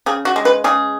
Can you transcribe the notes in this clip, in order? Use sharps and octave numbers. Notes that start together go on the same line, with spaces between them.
C#3 G#4
F#4
G#3
B4
C#3 G#4